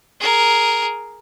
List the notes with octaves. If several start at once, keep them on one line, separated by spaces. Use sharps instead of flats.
G#4 A#4